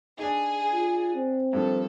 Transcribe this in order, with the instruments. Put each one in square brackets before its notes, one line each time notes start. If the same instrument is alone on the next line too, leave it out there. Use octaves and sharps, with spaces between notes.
[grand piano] D4 D#4 [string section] G#4
[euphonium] F4
C4
[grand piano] G2 D#3 F3 [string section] A4